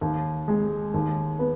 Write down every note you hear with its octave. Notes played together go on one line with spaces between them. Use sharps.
D#2
G#3
D#2
B3